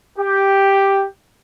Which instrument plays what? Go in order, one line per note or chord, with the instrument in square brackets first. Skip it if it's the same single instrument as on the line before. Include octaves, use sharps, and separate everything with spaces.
[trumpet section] G4